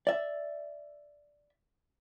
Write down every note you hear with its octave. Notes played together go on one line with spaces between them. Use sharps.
D5 E5